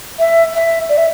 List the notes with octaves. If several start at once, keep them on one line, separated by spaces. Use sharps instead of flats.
E5
E5
D5
E5